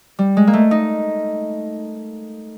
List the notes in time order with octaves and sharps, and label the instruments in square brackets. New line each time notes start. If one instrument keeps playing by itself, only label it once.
[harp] G3
G#3
A#3
A3
D#4